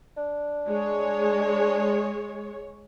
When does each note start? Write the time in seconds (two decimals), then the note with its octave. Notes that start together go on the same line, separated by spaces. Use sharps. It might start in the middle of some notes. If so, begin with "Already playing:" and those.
0.17 D4
0.67 G#3 C#5